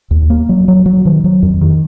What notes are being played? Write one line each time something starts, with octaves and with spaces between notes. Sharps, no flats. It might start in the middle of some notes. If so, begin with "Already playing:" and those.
D#2
A#3
F#3
F#3
F#3
D#3
F#3
F2
D#3